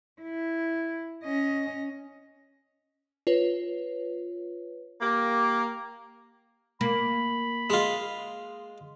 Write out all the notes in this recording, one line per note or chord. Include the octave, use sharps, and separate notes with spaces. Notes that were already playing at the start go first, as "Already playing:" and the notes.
E4
C#4 D#5
F4 B4 C#5
A#3 G4
A#3 B5
G#3 F4